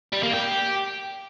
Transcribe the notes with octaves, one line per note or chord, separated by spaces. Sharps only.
G3
A#3
G4